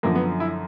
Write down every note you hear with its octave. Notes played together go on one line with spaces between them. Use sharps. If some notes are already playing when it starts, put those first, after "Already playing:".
F#2 D3 F3 A#3
B3
E4